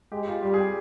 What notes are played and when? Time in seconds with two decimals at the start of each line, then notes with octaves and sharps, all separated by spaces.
0.12 G#3 G4
0.27 F4
0.42 G3 G4
0.54 G#4
0.59 G4